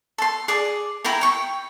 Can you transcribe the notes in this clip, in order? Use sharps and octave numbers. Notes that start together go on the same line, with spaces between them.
A4 C6
G#4 D5
E4 G5 G#5 A#5
G5 C#6